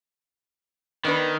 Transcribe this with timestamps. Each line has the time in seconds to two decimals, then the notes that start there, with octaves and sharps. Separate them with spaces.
1.05 D#3 B3 D4 B4